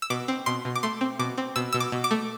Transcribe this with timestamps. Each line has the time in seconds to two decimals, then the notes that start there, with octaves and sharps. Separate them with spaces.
0.02 E6
0.10 B2 D6
0.28 C4
0.46 B2 C6
0.65 B2
0.76 D6
0.83 A3 C6
1.01 C4
1.19 B2 D6
1.38 C4
1.56 B2 E6
1.73 B2 E6
1.80 D6
1.92 B2
2.04 D6
2.11 A3